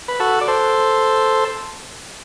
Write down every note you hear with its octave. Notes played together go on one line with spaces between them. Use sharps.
B4
F#4 A4
D5
A4 C5